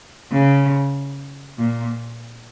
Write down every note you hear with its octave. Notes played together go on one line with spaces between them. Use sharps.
C#3
A#2